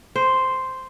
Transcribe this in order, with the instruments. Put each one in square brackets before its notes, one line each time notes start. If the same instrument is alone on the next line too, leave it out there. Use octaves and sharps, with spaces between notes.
[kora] C5